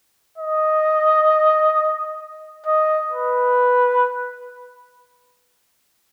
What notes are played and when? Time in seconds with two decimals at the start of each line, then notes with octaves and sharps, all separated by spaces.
0.38 D#5
2.67 D#5
3.12 B4